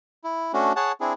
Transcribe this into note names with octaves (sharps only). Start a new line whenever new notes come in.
E4
A3 C#4 D4 F#4
G#4 C#5 F#5 A5
C4 D4 E4 G#4